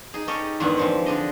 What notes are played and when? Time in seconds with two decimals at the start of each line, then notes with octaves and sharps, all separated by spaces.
0.14 D#4 G#4
0.27 C#4 G4 A4 C#5 D#5
0.60 E2 G2 D#3 G#3 C#5 F#5
0.77 E3 F3 C4
1.06 D3 D4 D#5